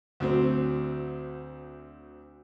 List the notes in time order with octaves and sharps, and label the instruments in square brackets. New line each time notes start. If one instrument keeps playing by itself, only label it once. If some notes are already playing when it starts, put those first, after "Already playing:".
[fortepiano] D2 F#3 C4